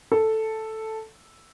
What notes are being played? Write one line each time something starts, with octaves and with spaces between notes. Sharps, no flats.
A4